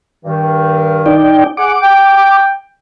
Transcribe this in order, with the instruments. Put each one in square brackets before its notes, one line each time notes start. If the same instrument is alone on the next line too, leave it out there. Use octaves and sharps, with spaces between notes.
[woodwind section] G2 D#3
[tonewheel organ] D#4 D5 G5
[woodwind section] G#4 F#5 [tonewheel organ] D6
[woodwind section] G5